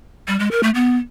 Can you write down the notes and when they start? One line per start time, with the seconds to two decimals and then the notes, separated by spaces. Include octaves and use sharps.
0.28 G3
0.40 G#3
0.51 A#4
0.63 A3
0.75 B3